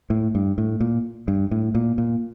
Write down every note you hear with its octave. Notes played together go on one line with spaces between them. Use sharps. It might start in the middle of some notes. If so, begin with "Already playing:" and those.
A2
G2
A2
A#2
G2
A2
A#2
A#2